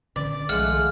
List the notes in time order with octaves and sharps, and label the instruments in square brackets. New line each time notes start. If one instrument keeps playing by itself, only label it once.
[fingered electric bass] A#2 D3 C#4 [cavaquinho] D5
[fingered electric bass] B1 D#3 F3 [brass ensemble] G#3 A3 F4 [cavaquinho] F#5 [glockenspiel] F6